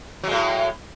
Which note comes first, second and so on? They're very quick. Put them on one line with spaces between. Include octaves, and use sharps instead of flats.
F#3 G#3 A2